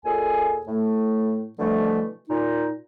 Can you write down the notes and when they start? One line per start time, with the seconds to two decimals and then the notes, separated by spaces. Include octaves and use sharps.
0.05 D#2 A#2 G#4 A4 G#5
0.67 A2 A3
1.59 B2 D3 E3 F3 G3 A3
2.29 A#2 D#4